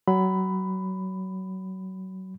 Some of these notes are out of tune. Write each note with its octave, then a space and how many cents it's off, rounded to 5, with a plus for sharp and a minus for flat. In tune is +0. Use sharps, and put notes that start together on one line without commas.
F#3 +25 B5 +10